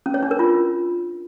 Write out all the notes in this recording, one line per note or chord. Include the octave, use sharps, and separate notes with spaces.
C#4
C#5
D4
A#4
F4